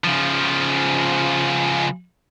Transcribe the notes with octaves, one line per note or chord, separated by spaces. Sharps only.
C#3 F3